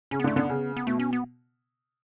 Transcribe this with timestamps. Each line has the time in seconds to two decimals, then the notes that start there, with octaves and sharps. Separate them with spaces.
0.11 C#3 C#4
0.20 B3
0.24 D3
0.27 A3
0.36 D3 B3
0.49 C#3
0.77 B3
0.87 B2 A3
0.99 C#4
1.13 B3